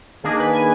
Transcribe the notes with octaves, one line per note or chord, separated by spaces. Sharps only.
D#3 A#3 D4 G#4
B4
G#5